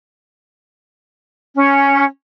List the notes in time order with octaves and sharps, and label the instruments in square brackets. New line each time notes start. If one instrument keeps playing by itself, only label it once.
[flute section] C#4